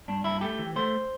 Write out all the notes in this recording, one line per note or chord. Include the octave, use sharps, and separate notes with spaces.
G2 D4
G2 E4
A3 G4
E3
A3 C5